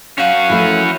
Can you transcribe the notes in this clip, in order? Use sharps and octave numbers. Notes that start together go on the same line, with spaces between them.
C#4 F#4 F5
E3 F3 A3 E4